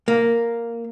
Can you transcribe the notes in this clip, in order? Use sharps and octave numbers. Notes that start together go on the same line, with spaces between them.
A#3